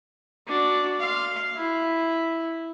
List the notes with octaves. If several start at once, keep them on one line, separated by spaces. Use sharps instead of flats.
D4 F#4
F5 C6
E4